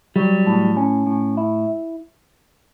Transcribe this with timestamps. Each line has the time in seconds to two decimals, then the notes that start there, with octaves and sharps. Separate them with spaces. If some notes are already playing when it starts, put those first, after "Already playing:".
0.16 F#3 G3
0.46 A2
0.77 C#4
1.07 A2
1.37 E4